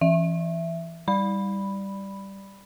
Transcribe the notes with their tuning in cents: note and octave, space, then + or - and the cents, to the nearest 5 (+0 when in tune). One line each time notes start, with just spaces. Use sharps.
E3 +25 E5 +10
G3 +0 D5 +0 B5 +0